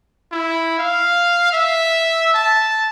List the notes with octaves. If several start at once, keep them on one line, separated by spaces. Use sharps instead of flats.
E4
F5
E5
A5